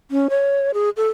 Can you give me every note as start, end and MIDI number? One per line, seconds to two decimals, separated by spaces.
0.11 0.28 61
0.30 0.71 73
0.74 0.90 68
0.97 1.08 69